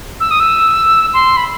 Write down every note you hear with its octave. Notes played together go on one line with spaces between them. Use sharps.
E6
D#6
E6
C6
B5